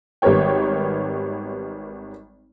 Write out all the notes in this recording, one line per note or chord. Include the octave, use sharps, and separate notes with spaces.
G#1 G3 B3 A#4 C#5 G5